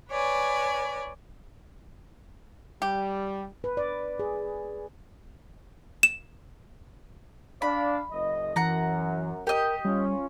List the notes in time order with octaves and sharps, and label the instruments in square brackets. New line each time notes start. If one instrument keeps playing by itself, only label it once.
[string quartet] B4 C#5 D5 G#5
[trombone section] G3 [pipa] G4
[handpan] B4
D5
G#4
[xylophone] E7
[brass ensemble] D4 D5 F5 [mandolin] B5
[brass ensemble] F#1 D#5
[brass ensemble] F#2 [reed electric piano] E3 [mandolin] F#5 A#5
[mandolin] G4 D#5 [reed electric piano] A#4 G5
[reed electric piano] G3 [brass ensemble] C#4 F4